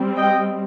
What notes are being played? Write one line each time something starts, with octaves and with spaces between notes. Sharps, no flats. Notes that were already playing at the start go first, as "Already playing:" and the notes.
Already playing: G3 C4
D#5 G5